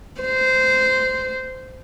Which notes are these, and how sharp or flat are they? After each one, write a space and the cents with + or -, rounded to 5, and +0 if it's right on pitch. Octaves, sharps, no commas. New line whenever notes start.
C5 -15